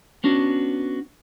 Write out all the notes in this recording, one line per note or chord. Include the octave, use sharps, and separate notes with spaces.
B3 C#4 D4 F#4